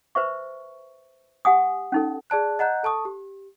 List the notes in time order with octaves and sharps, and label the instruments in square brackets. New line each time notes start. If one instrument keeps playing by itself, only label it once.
[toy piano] B4 C5 E5 C#6
G4 F#5 G#5 D#6
C#4 D#4 A4
[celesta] G#4 D5 A5 F#6
D#5 F#5 A#5 F#6 G6
A4 A5 C#6 D#6
G4